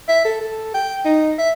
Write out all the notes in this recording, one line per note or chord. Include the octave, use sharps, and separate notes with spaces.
E5
A4
A4
G5
D#4
E5